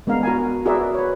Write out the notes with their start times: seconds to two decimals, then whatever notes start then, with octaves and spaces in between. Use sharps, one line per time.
0.07 G#3 B3 D4 A#4 F5
0.23 F#4 A#4 G#5
0.66 F#4 G#4 A#4 B4 D5 E5
0.94 B4 C#5